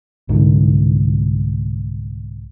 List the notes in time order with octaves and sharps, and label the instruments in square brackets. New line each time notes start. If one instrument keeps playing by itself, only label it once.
[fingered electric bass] C2 G#2 D3